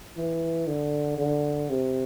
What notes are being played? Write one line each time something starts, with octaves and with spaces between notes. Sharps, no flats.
E3
D3
D3
C3